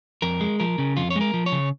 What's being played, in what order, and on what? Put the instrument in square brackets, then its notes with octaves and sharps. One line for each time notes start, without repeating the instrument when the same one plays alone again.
[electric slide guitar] F2 A#4
G#3
F3 A#4
C#3
F2 F4
C#5
G#3
A#4
F3
C#5
C#3